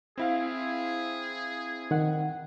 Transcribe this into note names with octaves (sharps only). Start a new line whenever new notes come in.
C4 E4 G#4 F5
D#3 F#5